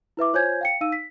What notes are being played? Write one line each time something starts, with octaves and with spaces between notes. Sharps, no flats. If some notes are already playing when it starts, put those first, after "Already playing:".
E4 B4 E5 D6
F4 C5 C#5 G#5 G6 G#6
F5 G5 C#7
D#4 F5 E6 D#7
B6